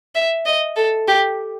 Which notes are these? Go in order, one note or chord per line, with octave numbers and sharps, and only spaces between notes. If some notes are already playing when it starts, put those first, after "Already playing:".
E5
D#5
A4
G4